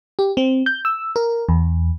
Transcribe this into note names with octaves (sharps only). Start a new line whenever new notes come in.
G4
C4
G6
E6
A#4
E2